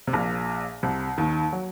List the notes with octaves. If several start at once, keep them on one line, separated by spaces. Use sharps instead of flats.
C3
A#1 A#2
C2 C3
D#2 D#3
F#3